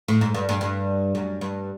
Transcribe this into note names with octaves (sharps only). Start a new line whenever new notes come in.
A2
G#2
G2
G2
G2
F#2
G2